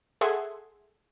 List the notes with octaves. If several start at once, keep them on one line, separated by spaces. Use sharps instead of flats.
G#4 A4 E5 F#5 C6 G#6